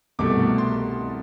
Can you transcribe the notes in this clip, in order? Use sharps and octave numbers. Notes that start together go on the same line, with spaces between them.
C2 B2 A3 D6
C6